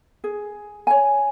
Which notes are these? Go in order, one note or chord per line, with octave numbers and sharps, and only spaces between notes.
G#4
C#5 G#5